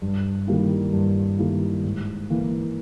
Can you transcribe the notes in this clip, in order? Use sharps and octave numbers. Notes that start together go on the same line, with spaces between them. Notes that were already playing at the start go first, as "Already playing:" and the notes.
G2
D#3 G3 A#3 E4
G2
D#3 G3 A#3 E4
G#2
E3 A#3